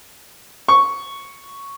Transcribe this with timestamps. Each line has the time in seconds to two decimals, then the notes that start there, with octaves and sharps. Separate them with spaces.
0.68 C#6